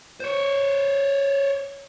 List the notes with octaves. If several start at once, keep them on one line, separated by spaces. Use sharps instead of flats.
C5 C#5